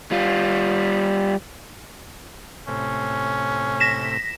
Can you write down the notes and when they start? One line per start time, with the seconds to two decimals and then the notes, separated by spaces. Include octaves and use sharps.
0.11 G3 F4
2.68 A2 C3 C#4
3.80 A#6 B6 E7